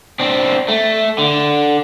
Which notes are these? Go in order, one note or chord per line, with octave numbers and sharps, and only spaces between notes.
C4 D4
A3
D3